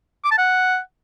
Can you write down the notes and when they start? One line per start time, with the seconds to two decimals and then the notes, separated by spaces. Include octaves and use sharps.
0.24 D6
0.31 A5
0.38 F#5